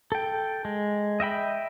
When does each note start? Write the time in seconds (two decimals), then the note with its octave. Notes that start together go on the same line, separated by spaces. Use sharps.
0.12 A4 G5
0.65 G#3
1.20 D#5 E5 G5 B5